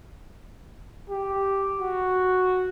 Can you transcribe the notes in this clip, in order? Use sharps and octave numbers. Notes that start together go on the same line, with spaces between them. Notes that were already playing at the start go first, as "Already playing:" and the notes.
G4
F#4